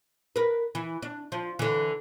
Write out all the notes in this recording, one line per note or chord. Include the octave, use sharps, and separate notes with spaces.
A#4 B4
E3
D4
F3
D3 E3